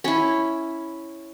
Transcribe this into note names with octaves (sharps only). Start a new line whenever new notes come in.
C#4 E4